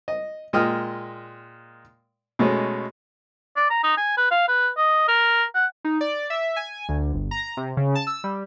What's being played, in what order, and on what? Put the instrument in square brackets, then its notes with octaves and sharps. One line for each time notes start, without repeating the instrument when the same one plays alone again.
[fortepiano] D#5
A#2 G#3 D#5 G5 D#6 F6
B2 G#3 A3 C#4
[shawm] D5
A#5
D#4
G#5
B4
F5
B4
D#5
A#4
F#5
[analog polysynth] D#4
D5
E5
G#5
D2
G1
A#5
C3
C#3
A5
E6
G3